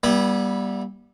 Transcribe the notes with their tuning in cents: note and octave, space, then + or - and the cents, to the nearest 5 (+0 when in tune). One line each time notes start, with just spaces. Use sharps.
G3 +0 B3 -40 E4 -10